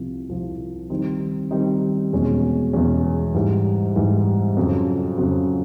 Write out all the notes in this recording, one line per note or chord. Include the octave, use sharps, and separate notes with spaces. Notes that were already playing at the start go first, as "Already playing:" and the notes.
Already playing: C2 C3 F3
C2 C3 F3
D#3 G3 C4 D#4
D#3 G3 C4 D#4
E2 B2 G#3 C#4
E2 B2 G#3 C#4
G#2 E3 G3
G#2 E3 G3
F2 C#3 F#3
F2 C#3 F#3